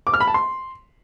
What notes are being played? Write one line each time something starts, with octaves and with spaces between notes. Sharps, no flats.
D6
F6
B5
A5
C6